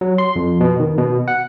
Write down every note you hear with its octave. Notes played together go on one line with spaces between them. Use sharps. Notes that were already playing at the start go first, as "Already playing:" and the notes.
F#3
C6
F2
B2
D#3
B2
F#5